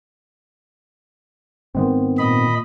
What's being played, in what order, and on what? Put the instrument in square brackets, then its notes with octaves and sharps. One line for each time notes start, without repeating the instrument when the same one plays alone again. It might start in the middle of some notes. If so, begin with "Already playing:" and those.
[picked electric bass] G#2 G#3 B3 [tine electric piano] D#3 C4
[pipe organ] A#2 D#5 B5